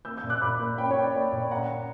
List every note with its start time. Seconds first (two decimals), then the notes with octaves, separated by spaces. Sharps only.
0.05 A#3 E6 G6
0.17 E6 G6
0.23 A#2
0.29 D6 F#6
0.41 A#2 B5 D6
0.60 A#3
0.78 C#4 G5 B5
0.91 C#5
0.96 C#4
1.02 D5
1.15 A#3 C#5
1.32 A#2 D5
1.51 C#4 F#5 A#5
1.69 C#4